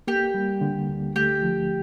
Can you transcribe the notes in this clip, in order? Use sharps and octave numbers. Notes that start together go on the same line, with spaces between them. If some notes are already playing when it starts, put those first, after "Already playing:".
A#3 G4
G3
D3
D2
A3 G4
F3